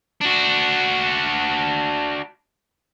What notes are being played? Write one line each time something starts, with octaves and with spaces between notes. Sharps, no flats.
D4 F#4